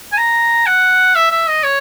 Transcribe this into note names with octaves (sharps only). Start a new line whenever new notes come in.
G#5
A#5
F#5
E5
E5
D#5
C#5